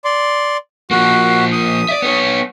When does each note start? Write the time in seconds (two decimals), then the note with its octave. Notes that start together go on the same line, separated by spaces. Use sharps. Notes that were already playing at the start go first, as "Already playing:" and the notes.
0.05 D5 C6
0.91 F3 A#3 F#4
1.52 D#6
1.89 D5 E5
2.02 B3 C#5